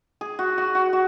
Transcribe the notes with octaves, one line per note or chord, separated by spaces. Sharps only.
G#4
F#4
F#4
F#4
F#4